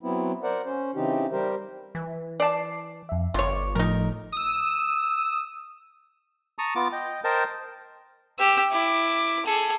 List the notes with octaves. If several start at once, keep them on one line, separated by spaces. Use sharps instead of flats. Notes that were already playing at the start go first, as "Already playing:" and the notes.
F#3 B3 C4 E4
A#4 C5 D5 F#5
C#4 C5
C#3 E3 C4 D#4 G4
G3 G4 A#4 C5
E3
D5 A5 D6 C7
F2 E5
G1 F4 C#5 D6
A2 F3 A3 D#4 A#4
D#6 E6
A5 A#5 C#6 D#6
B3 F4 D6
D#5 G5
A#4 C5 D#5 G5 A5
G4 E6
E4 D6
G#4 A4